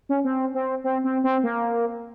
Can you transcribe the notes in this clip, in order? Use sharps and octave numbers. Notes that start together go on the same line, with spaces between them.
C#4
C4
C4
C4
C4
C4
A#3